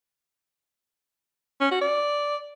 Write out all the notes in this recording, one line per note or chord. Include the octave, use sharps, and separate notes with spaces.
C#4
F#4
D5